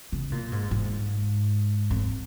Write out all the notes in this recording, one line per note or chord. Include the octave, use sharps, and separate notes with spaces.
C#3
A#2
G#2
G#2
F2